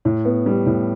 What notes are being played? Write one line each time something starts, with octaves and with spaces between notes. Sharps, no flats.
A2
B3
G3
A2